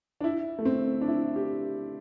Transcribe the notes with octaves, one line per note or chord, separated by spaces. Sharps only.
D4
E4
A3
C4
D4
E4
G4